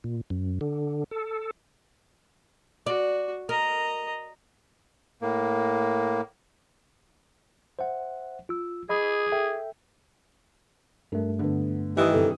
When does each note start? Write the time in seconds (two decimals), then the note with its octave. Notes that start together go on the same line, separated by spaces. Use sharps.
0.04 A#2
0.30 F#2
0.61 D3
1.11 A4
2.86 F#4 D5
3.49 A#4 D#5 A#5
5.22 A2 A#3
7.79 C5 E5 F#5
8.49 F4 E6
8.89 G#4 D#5 B5 D#6
9.32 A4 E5 G5
11.12 G2 A3 A#4
11.39 D3 B3
11.97 D#3 E3 G3 G4 D#5 D#6
12.12 G2 C3 A4